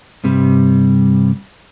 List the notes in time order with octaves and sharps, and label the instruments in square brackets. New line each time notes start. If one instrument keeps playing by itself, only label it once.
[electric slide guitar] G2 C3 G3